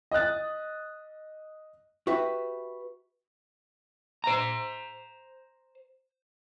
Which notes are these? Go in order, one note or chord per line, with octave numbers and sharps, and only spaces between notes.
D#5 D#6 F#6 A6
F#4 G4 B4 E5
C5 A#5